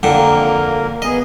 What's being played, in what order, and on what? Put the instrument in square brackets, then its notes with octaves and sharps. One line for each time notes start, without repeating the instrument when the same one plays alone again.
[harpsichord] F2 D3 [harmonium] A#3 A#4
[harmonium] B3 G#4 [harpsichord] D#5